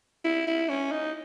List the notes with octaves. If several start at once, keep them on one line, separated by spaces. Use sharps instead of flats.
E4
E4
C#4
D#4